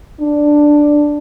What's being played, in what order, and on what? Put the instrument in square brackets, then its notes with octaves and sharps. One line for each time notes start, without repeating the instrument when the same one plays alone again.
[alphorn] D4